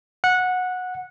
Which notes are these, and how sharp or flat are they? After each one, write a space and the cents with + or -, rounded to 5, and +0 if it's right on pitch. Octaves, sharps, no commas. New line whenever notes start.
F#5 -15